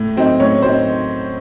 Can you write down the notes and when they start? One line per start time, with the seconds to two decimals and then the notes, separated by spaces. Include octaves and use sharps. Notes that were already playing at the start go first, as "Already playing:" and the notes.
Already playing: A2
0.16 F#3 C4 D#4
0.39 A2 C#5
0.62 F#3 C5
0.66 C4 D#4